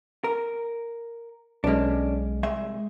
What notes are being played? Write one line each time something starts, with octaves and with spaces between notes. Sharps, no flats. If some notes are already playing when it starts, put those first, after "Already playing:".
A#4
B1 G#3 C#4 D4
C2 G#3 E5